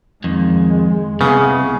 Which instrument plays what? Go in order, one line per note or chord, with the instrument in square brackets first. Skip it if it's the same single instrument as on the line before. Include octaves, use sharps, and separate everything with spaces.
[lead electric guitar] F2 D#3 [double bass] G#3
[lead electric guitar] C2 [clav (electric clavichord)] C#3 [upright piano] B3 G#4